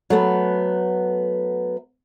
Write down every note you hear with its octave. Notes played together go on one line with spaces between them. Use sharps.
F#3 A3 B3